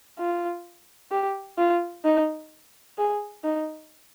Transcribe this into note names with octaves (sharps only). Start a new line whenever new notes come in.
F4
G4
F4
D#4
G#4
D#4